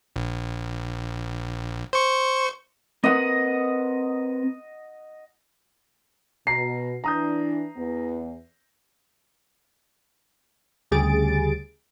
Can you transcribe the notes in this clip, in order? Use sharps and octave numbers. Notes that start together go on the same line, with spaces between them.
A#1
C5 C#6
C4 A#4 B4 D#5 F#5
B2 A#5 C7
E3 D4 A#5 D#6 G6
E2 B3
D2 C#3 G3 G#4 A6 D7